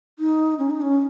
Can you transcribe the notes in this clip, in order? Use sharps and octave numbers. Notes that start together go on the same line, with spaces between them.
D#4
C#4
D#4
C#4